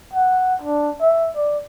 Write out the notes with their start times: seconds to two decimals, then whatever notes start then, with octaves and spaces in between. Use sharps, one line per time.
0.13 F#5
0.62 D4
1.01 E5
1.36 D5